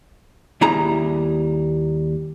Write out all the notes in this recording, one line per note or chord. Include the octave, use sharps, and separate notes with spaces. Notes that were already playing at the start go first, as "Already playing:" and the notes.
D#2 G3 E4 G#4 A#5